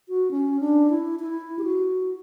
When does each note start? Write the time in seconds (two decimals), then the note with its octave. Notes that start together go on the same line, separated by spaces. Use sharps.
0.09 F#4
0.31 C#4
0.60 D4
0.90 E4
1.19 E4
1.59 G4
1.64 F#4